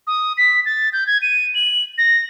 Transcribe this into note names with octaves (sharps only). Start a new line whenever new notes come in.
D#6
B6
A6
G6
G#6
D#7
F#7
A#6